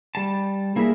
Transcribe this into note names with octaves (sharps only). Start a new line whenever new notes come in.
G3 A5
A#3 E4 G#4 A#4 E5